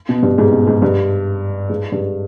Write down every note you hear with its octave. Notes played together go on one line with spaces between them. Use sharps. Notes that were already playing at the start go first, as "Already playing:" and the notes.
B2
G2
G#2
B2
G#2
G2
G#2
G2